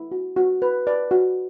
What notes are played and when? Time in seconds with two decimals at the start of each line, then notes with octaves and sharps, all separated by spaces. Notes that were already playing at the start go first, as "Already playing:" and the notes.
Already playing: E4
0.12 F#4
0.36 F#4
0.62 B4
0.87 B4 D5
1.11 F#4